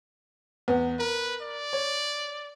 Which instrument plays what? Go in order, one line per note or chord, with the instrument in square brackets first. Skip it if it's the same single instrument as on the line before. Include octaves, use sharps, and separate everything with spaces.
[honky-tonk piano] E2 B3
[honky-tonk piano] A#4 [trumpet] B4
[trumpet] D5
[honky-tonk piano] C#5